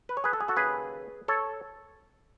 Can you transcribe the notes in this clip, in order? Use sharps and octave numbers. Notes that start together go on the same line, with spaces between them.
B4
C#5
G#4 B4
A4
G#4
F#4 A4
D#2 C#3 F#3 G#4 B4
A4 C#5